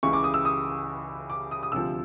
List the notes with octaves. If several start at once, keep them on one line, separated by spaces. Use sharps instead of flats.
C#2 C#3 E3 C#6
D6
D#6
E6
D#6
D6
D#6
D#6
D2 C3 F3 E6